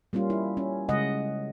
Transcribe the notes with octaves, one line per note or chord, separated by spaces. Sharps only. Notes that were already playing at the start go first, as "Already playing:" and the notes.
G3 A#3 C#4 F4
E4
C#4
C#3 G#3 D#5 F#5